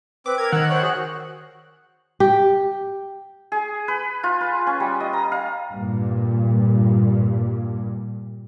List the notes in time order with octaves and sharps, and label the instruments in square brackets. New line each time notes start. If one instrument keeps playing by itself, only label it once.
[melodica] C4 [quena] B4 [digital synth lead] D6
[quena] A#4 [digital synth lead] G#6
[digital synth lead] D#3 [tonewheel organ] F#5 [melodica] E6
[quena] C5 [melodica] C#5
[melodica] F#4 G#4
[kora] G4
[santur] G#4
B4
F4
B4
C#4
G3
D#5
A#5
F5
[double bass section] G2 A#2